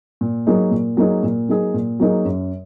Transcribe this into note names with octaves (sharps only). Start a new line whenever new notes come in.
A#2
F#3 A#3 D#4 G#4
A#2
F#3 A#3 D#4 G#4
A#2
F#3 A#3 D#4 G#4
A#2
F#3 A#3 D#4 G#4
F#2